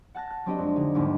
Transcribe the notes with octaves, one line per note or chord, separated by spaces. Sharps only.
F#5 A5 F#6 A#6
F#6
F#3 C4 D4 G4 D#5
F2 G#3
D3 D#4
G1 D#2 G#2